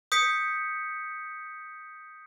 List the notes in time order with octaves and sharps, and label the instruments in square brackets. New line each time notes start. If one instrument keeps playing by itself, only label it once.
[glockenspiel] D#6 G6 B6 C#7